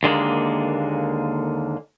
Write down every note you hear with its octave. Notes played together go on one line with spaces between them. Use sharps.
D#2 D3 G#3 A#3